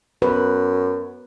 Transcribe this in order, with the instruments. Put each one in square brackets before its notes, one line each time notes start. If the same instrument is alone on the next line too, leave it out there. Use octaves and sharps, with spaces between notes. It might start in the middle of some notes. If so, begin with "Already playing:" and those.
[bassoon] F#2 [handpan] B4